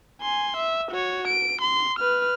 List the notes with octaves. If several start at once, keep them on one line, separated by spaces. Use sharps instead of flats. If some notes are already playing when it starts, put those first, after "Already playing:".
G#5 C6
E5
F#4 C#5
D7
C6
B4 F6